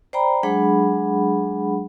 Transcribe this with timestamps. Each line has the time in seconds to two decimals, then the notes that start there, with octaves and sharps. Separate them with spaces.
0.13 C5 D5 G5 A#5 B5
0.43 F#3 G#3 D4 G#4 F#5 B5